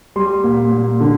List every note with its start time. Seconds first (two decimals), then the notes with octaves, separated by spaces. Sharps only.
0.16 G3 C6
0.44 A#2
0.72 A#2
1.00 D3